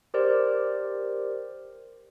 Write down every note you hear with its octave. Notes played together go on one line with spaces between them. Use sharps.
G4 A#4 C5 D5